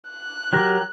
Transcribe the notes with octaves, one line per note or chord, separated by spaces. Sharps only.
F#6
F#3 G4 A#4